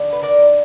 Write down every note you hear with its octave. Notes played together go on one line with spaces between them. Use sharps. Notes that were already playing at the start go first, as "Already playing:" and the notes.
Already playing: D3 F3 B3 D4
B4
A#4 D5